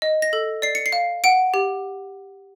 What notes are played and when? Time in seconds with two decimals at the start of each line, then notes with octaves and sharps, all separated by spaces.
0.02 D#5
0.22 A#6
0.33 A4
0.62 D5 C7
0.75 C#7
0.86 C7
0.92 F5
1.24 F#5 D7
1.54 G4